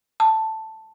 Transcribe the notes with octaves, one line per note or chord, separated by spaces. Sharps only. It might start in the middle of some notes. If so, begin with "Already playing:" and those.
A5